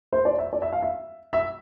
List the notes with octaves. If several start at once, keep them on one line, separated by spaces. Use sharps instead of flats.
C5
D5
E5
D5
E5
F5
E5
E5